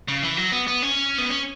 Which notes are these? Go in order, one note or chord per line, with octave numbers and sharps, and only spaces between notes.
C#3
E3
F#3
B3
B3
C#4
B3
C#4